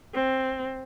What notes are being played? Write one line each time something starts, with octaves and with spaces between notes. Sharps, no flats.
C4